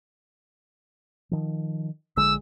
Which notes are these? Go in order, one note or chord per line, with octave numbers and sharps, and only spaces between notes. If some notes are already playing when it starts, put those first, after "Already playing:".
D#3 F3
A#1 D3 G#3 E6